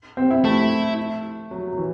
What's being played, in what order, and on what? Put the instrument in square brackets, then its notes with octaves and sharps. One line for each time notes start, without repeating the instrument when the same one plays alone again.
[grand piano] C4
E4
[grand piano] A3 [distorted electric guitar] E4
[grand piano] F#3
F#3
E3